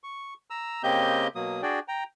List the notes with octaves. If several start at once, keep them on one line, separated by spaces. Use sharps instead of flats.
C#6
A#5 E6
C#3 A#3 C4 G4 D#5 G6
B2 F#3 A#3 D#6
D4 F#4 G#4 D5 G5
G5 A#5